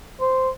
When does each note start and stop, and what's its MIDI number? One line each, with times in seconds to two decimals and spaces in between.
0.20 0.49 72